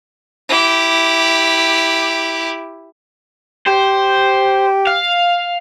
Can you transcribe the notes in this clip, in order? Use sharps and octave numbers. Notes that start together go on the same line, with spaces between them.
E4 G4
G4 C5
F5